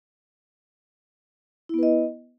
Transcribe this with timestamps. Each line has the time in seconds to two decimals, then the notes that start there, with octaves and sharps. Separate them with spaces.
1.69 E4
1.74 B3
1.78 B4
1.83 D#5